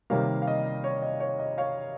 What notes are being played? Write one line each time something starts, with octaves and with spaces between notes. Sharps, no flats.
C3 D#3 G3 A#3 C#5 F5
F5
D#5
C#5
D#5
C#5
D#5
C#5 F5